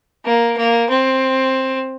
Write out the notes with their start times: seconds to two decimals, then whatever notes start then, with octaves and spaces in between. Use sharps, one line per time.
0.25 A#3
0.57 A#3
0.90 C4